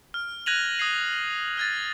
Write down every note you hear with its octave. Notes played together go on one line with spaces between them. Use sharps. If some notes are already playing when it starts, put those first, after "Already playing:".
F6
F#6 G#6 A#6 D#7 F7 F#7
D#6 G#6 C7
F6 G#6 A6